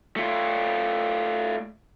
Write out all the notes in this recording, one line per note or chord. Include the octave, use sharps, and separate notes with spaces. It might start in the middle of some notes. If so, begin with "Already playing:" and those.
A3 F4